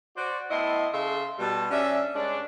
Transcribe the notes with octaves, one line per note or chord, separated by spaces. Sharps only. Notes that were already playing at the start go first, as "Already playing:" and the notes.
F#4 C5 D5
A2 B3 E4 D#5 A5 C6
C#3 A4 E5 F5 C6
B2 G3 A5
C#4 D4 E5
G2 G#3 C#4 D4